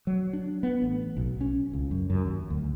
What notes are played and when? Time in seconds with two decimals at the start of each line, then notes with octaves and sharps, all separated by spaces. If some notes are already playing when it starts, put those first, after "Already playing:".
0.07 F#3
0.33 D4
0.63 B3
0.82 A1
1.17 B1
1.41 C#4
1.73 C#2
1.91 F#2
2.10 F#2
2.25 D#2
2.50 D2